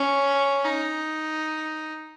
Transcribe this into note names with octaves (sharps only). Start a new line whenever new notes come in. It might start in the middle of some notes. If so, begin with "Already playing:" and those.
Already playing: C#4
D#4